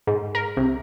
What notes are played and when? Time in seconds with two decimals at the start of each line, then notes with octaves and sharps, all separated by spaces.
0.07 G#2
0.35 A#4
0.57 C2